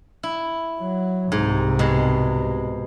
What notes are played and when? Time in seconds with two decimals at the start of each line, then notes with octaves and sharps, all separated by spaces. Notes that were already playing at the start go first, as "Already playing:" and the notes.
0.23 E4
0.80 F#3
1.32 C2 G#2 C3
1.79 B2 G#3